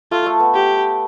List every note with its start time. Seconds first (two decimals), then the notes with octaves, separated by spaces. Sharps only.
0.11 A3 F4
0.26 A3
0.40 B3
0.54 G4